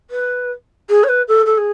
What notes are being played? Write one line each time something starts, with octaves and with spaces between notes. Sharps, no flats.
B4
G#4
C#5
B4
A4
A4
G#4